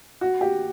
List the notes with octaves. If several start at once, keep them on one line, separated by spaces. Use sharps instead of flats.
F#4
G4